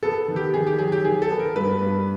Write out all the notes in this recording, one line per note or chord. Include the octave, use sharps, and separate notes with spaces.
B3 A4
D#3
G4
D#3 G#4
G4
F#3 G#4
G4
D#3 G#4
A4
B3
A#4
G2 B4
G2